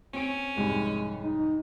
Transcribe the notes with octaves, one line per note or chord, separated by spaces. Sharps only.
C4 C#4 D7
C2 F2 G#2 G#3
D#4